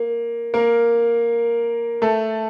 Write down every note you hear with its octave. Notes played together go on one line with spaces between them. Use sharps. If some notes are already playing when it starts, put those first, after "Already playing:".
Already playing: A#3
A#3 A#4
A3 A4